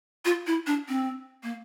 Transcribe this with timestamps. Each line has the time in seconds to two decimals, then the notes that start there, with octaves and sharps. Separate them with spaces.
0.25 F4
0.47 E4
0.67 D4
0.88 C4
1.43 A#3